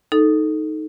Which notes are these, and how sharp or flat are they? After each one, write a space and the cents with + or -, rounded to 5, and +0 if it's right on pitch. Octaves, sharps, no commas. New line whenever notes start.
D#4 +0 A4 -10